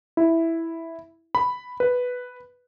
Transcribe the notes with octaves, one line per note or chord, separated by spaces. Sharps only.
E4
B5
B4